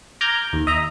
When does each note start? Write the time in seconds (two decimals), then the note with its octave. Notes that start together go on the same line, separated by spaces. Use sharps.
0.21 A#5 D6 F6 G6 G#6
0.53 D#2
0.67 D#5 E5 A#5